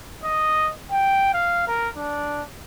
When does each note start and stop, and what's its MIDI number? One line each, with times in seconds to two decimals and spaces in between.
0.24 0.68 75
0.91 1.31 79
1.34 1.66 77
1.68 1.89 70
1.97 2.42 62